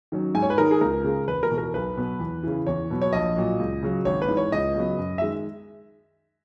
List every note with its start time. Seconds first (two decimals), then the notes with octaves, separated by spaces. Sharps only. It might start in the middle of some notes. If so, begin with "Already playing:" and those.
0.12 D#3 F#3 C#4
0.35 G#2 G#5
0.42 C#5
0.50 B4
0.58 D#3 G#3 D#4 A#4
0.71 G#4
0.81 C#2 A#4
1.04 C#3 G#3
1.27 E1 B4
1.43 A#4
1.50 E2 B2
1.58 A#4
1.74 B1 B4
1.97 B2 F#3 B3
2.20 E2
2.43 C#3 E3
2.67 E2 C#5
2.90 B2 F#3 B3
3.02 C#5
3.13 A#1 D#5
3.36 A#2 F#3
3.59 C#2
3.83 C#3 F#3
4.05 G#1 C#5
4.22 B4
4.28 G#2 E3
4.37 C#5
4.52 C#2 D#5
4.75 C#3 F#3 B3
4.98 F#2
5.18 D#3 G#3 E5